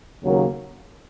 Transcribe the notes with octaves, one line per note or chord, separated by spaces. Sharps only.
D#2 C#3 F#3 A#3